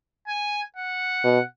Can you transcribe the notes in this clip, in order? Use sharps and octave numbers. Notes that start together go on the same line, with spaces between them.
G#5
F#5
B2